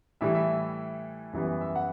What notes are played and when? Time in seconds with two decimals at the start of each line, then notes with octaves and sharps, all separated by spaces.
0.21 A2 E3 G3 E5
0.35 E5
1.33 F#2 E3 G3 B3
1.61 E5
1.76 F#5